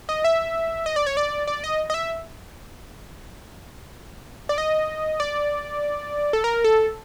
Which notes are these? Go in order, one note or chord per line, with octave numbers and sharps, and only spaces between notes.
D#5
E5
D#5
D5
C#5
D5
D5
D#5
D#5
E5
D5
D#5
D5
A4
A#4
A4